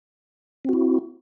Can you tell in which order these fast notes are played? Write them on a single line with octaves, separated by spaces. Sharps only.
C4 F#4 E4